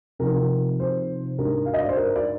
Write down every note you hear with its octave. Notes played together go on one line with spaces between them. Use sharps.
C3 F3 C4 D#4 A#4
A#4
C5
G#2 G3 D4 A#4
F5
D#5
D5
C5
A#4
D5